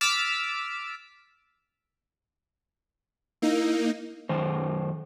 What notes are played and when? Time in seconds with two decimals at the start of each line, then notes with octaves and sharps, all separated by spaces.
0.01 D6 E6 F6 A6 B6 D7
3.42 A#3 D#4 E4
4.29 F#2 D#3 C5